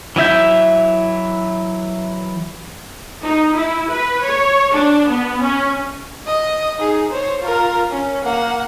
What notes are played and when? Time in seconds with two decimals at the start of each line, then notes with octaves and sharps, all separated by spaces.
0.16 E3 F#3 E4 E5 G6
3.24 D#4
3.55 E4
3.92 B4
4.24 C#5
4.73 D4
5.09 B3
5.42 C#4
6.27 D#5
6.79 D#4 G#4
7.11 C5 C#5
7.41 F4 A#4
7.91 C#4
8.24 A#3 F#5